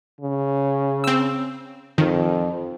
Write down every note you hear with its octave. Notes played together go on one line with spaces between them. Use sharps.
C#3
C4 E6
F2 D#3